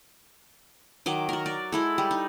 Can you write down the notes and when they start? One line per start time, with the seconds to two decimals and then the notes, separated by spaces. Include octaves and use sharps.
1.06 D#3 F#3 D#5 D6
1.29 F#4 A#4
1.46 D5
1.72 G#3 E4 A4
1.98 G3
2.11 D#4